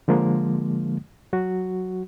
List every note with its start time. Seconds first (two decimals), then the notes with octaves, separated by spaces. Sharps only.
0.08 D3 F3 G#3 A#3
1.33 F#3 F#4